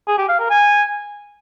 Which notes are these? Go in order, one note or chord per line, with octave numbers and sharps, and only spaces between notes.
G#4
G4
F5
A#4
G#5